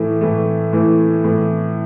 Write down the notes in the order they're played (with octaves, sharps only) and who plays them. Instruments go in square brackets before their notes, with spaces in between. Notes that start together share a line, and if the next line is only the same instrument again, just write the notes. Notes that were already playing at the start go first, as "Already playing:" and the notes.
Already playing: [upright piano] A2 E3 A3
A2 E3 A3
A2 E3 A3
A2 E3 A3